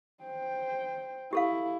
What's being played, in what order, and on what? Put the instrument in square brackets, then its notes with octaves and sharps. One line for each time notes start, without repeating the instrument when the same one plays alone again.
[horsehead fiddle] C5 G5
[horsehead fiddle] E4 [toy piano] G4 A4 F5